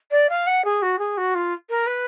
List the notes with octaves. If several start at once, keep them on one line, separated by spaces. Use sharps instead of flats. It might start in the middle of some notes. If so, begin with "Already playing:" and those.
D5
F5
F#5
G#4
F#4
G#4
F#4
F4
A#4
B4